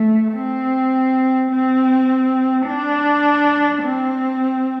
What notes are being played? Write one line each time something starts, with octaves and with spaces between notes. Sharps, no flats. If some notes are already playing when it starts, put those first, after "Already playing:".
Already playing: A3
C4
C4
D4
C4